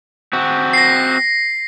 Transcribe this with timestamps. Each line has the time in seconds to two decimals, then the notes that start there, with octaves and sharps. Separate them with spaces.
0.33 C4 F#4
0.73 A#6 C7